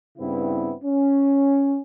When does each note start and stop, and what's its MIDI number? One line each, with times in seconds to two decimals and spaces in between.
0.18 0.72 43
0.18 0.72 49
0.18 0.72 59
0.18 0.72 60
0.18 0.72 64
0.83 1.79 61